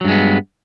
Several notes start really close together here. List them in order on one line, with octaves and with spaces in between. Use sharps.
F#3 G2 G#3 B3